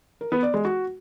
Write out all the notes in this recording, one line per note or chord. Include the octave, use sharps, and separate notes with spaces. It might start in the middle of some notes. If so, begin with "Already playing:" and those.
A#4
B3
D5
G#3
F#4